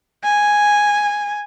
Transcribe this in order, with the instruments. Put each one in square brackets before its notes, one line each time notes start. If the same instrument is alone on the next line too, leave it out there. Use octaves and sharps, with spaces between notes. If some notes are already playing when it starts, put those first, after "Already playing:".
[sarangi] G#5